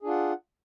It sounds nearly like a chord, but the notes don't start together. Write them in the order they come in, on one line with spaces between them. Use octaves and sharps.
G#4 D4 F4 F#5